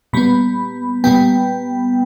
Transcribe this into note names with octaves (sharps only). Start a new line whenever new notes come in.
A#2 G3 B3 B5
A#2 G3 B3 G5